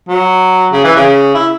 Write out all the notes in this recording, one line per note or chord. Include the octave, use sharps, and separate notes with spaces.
F#3
C#3
E3
C#3
E4